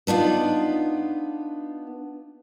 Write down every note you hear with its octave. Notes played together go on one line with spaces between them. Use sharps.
B3 D4 D#4 F4